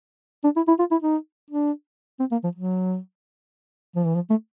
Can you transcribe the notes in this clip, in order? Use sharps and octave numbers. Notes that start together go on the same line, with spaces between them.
D4
E4
E4
F4
E4
D#4
D4
C4
A#3
F3
F#3
F3
E3
F3
A3